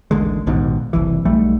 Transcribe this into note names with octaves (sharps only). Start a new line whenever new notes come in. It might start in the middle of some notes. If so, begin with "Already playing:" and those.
A1 D#2 D3 G#3
A#1 D#2 G#2 B2
F#1 C2 E3
B1 G3 A3